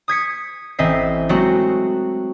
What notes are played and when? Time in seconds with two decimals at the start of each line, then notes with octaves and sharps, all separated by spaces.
0.08 D#6 G#6 B6 C#7
0.78 A1 C4 D#5 E5 C7
1.29 F#3 G#3 A3 C4 F#4